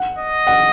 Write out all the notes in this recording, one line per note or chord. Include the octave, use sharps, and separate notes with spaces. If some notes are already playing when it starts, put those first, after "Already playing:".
Already playing: F#5
D#5
F#5